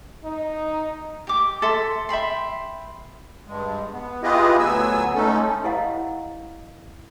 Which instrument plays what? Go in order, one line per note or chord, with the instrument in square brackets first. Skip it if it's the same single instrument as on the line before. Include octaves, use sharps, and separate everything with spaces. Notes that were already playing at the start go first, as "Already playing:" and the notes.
[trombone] D#4
[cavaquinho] G4 D6
A4 E5 C6
E5 G5 B5 C6
[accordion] G2 G#3
B3
E4 F4 G4 G#4 B4 D#5
D2 F#3 B3 G#5 E6
G#3 A3 C#4 D#4 A4
[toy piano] E4 G4 D#5 F5 F#5